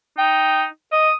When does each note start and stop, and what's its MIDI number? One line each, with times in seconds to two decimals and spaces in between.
0.18 0.66 63
0.18 0.65 79
0.92 1.09 75
0.92 1.14 87